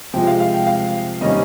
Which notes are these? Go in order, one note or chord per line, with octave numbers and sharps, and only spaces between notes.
C3 F3 G#3 G5
F5
F5
G5
F5
C3 D#3 G3 A#3 C#4 D#5